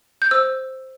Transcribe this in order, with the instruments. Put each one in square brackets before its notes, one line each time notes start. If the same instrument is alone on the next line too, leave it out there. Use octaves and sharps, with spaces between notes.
[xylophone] G6
C5 E6